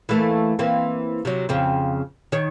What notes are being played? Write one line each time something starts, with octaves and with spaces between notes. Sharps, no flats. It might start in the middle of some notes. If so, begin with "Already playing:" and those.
E3 A3 A#3
E3 A#3 C4
C3 F#3
F2 C#3 C4
D#3 C#5